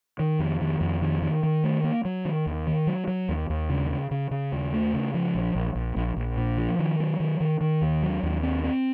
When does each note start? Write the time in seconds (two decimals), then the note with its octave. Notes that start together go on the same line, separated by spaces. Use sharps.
0.19 D#3
0.39 F2
0.61 D#3
0.81 F2
1.02 D#3
1.22 D#3
1.43 D#3
1.64 A3
1.84 A#3
2.05 F#3
2.25 D#3
2.46 D#2
2.67 D#3
2.87 F#3
3.08 F#3
3.29 D#2
3.50 D#2
3.70 C#3
3.90 C#3
4.11 C#3
4.31 C#3
4.52 D#2
4.73 A3
4.93 C#3
5.14 F3
5.35 A#1
5.55 A#1
5.75 A#1
5.96 A#1
6.16 A#1
6.37 A#2
6.58 F3
6.79 D#3
7.00 F#3
7.20 D#3
7.40 D#3
7.61 D#3
7.82 D#2
8.03 F#3
8.23 D#2
8.43 C4
8.64 C4